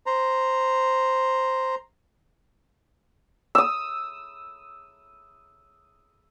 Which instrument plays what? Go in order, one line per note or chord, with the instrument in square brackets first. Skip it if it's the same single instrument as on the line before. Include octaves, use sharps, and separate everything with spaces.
[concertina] C5 A#5
[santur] D#6 E6